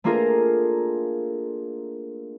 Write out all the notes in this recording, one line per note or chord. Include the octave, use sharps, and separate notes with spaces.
A3 A#3 D4 F4 G#4 A#4